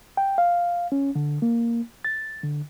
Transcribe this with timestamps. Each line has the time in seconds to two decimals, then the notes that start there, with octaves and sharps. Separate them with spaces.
0.17 G5
0.38 F5
0.92 C#4
1.15 D3
1.42 A#3
2.05 A6
2.43 D3